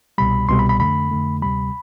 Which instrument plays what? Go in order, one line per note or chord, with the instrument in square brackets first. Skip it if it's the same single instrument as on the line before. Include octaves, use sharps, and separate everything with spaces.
[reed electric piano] C2 B2 G3 B5
C2 B2 G3 C6
B5
B5
F2 D3 A3 B5
F2 D3 A3
D2 C3 G3 B5